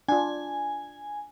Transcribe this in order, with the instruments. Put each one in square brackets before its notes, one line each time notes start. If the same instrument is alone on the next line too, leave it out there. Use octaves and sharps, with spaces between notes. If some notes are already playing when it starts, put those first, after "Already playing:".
[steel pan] D4 F4 [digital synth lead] G#5